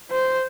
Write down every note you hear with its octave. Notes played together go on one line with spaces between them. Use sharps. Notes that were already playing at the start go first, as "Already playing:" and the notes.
C5